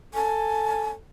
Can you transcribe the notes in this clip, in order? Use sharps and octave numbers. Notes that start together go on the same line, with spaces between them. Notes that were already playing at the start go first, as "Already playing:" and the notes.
A4 G#5